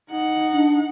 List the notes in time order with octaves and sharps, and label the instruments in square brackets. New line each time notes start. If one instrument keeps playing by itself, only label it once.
[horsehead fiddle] D#4 F#5
[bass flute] D4